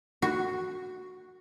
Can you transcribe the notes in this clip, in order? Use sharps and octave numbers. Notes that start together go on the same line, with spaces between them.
F#4